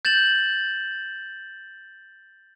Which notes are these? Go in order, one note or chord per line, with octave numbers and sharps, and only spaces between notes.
G6 A6 E7 F#7